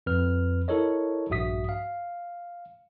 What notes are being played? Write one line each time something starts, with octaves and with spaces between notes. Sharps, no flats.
F2 B4 F6
E4 A4 A#4 C#5 D#5
A#1 G2 F#4 E5 D#6 B6
F5